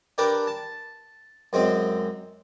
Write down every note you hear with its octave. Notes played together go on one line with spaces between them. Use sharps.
D4 G4 A#4 B4
A5
F#2 G#3 C4